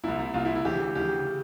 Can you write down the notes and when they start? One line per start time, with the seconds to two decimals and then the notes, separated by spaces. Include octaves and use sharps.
0.04 C2 A#2 E4
0.19 E4
0.34 C2 A#2 F4
0.45 E4
0.55 E4
0.65 D2 C#3 E3 G4
0.80 G4
0.95 D2 C#3 E3 G4
1.27 C#3